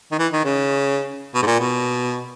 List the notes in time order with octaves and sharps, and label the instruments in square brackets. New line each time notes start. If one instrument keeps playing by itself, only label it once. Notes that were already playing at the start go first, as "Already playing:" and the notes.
[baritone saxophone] D#3
E3
D#3
C#3
B2
G#2
A#2
B2